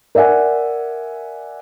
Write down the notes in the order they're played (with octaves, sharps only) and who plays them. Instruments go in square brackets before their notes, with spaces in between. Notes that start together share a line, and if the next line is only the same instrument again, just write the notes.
[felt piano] A#4 D5 E5 F#5 G#5